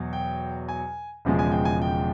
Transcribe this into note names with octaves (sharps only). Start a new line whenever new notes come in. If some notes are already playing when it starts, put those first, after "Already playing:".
Already playing: E2 B2 F#3
G5
G#5
E1 E2 C#3 F3 G#3
G#5
G5
G#5
G5